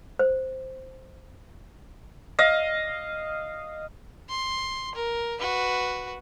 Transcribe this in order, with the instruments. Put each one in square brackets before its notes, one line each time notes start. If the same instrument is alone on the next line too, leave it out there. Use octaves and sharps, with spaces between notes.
[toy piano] C5
[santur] D#5 F5
[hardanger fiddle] C6
A#4
F#4 B4